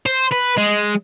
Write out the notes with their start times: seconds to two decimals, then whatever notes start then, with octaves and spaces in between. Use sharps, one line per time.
0.06 C5
0.32 B4
0.57 G#3